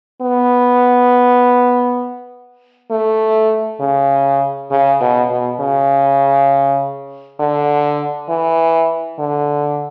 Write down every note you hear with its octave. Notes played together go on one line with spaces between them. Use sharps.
B3
A3
C#3
C#3
B2
B2
C#3
D3
E3
D3